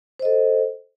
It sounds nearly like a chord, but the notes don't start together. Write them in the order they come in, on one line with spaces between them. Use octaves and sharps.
C5 D#5 A4